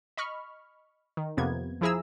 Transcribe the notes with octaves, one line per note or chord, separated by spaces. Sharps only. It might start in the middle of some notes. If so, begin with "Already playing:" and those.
D#5 B5 C#6 F6
D#3
F2 C3 A#3 B3 G#6
F3 E4 G#4 A#5 E6